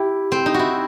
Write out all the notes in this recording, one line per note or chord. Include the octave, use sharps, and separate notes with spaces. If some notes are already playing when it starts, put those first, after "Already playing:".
Already playing: E4 G4
C4
D#4
E4 F#4